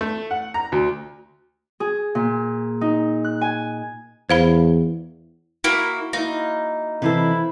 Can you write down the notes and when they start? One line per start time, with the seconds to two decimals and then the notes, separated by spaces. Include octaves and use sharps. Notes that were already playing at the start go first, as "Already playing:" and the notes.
0.01 A3
0.31 F#5
0.54 A#5
0.72 D2
1.80 G#4
2.15 A#2
2.81 D#4
3.24 F#6
3.41 G#5
4.29 E2 C5 F5 B5
5.64 A#3 E4 F#4
6.13 A#3 D#4 E4
7.02 C3 E3 E4 A4 B4 C5